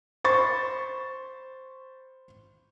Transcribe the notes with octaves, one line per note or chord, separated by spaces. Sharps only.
C5 B5 C#6 A6